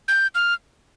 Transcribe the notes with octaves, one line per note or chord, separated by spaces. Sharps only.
G6
F6